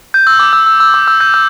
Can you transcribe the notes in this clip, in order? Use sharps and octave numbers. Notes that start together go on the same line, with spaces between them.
G6
E6
D6
E6
E6
E6
D6
E6
G6
E6